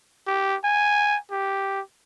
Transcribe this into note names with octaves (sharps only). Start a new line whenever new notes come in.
G4
G#5
G4